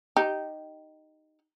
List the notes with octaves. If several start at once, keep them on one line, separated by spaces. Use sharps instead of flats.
D#4 G4